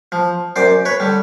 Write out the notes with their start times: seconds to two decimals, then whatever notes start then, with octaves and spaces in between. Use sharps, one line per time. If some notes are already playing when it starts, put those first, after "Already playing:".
0.12 F3
0.56 F#2 C5 D5
0.85 B4 C#5
1.00 D3 G3